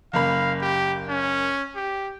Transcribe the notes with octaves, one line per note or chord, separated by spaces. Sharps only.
F#1 A#3 F5 B5
G4
C#4
G4